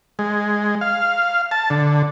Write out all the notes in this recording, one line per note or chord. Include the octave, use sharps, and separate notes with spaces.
G#3
F5
A5
D3